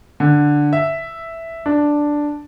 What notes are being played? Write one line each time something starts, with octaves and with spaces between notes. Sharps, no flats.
D3
E5
D4